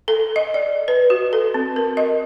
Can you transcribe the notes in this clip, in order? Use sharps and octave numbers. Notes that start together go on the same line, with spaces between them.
A4
D#5
D5
B4
F#4
A4
C4
A#4
D#5